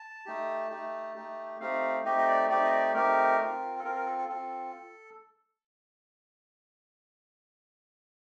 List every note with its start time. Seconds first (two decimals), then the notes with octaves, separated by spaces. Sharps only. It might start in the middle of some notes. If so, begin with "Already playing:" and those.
Already playing: A5
0.26 A3 D#4 G4
0.70 A3 D#4 G4
1.15 A3 D#4 G4
1.60 A3 C4 D#4 G4 F5
2.05 A3 C4 D#4 G4 D#5
2.18 D#5
2.28 D5
2.50 A3 C4 D#4 G4 D5
2.65 D#5
2.72 D5
2.94 A3 C4 D#4 G4 A#4
3.39 C4 F4
3.79 A4
3.84 C4 F4 A#4
3.95 A#4
4.06 A4
4.18 A4
4.29 C4 F4 A4